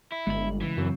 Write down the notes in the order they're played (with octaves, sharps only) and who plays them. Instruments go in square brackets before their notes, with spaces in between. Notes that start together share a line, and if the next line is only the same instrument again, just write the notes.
[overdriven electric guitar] E4
[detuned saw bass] G1 [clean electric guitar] G#3 B5
[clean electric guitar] C#2 [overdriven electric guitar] E3
[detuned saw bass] F#2 [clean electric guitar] C#3 F#3 C4